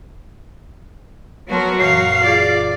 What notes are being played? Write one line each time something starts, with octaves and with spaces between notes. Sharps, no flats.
F#3 B3 F#4 A#4 B4 A5 C6
F#2 A#2 E3 F5 C7
F4 G#4 D5